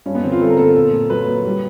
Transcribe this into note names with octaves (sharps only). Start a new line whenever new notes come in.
G2 C#4
B3
D3 C4
F4
G2 A4
A#4
A#3 A4
A#2
A#3
F#3 B4
A#3
G3